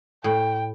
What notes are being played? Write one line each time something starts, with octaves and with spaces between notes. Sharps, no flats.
A2 G5